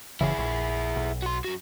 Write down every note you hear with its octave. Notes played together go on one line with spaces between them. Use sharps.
F#1 C#3 E3 E4 G#4
A#1
B1
F#4 C6
F#2 F#4